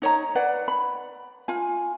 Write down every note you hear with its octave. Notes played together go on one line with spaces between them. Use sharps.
D#4 C#5 D#5 A#5
B4 D5 F#5
B5
F4 G#5